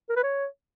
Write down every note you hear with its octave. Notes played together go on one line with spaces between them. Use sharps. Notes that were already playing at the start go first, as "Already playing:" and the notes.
A#4
B4
C#5